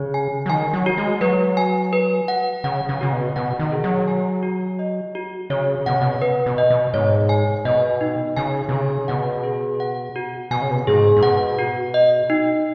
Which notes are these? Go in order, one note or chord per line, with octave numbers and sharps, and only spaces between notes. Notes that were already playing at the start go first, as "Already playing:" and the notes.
Already playing: C#3 C#5
G#5
F#3
D#3 G#5
F#3
F#4
G#3
F#3 B4
G#5
B4
F#5
C#3 F#5
C#3
C#3 F#4
B2
B2 F#5
D#3
G#4
F#3
G#5
F#4
D#5
F#4
C#3 C#5
B2 F#5
C#3
B2
B4
B2
D#5
B2
G#2 C#5
G#5
B2 D#5
D#4
C#3 G#5
B2
C#3 G#4
B2 F#5
G#4
F#5
F#4
B2 G#5
C#3
B2
G#2 G#4
G#2
B2 F#5
F#4
D#5
D#4